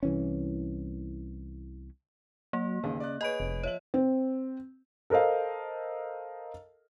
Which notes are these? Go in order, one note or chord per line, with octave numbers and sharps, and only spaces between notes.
C2 E3 C#4
F#3 A#3
A1 D#2 C#3
D5 D#5 F#6
G#4 B4 C#5 D#5 D7
F1
F3 C#5 E5 F#7
C4
A4 A#4 C5 D#5 F5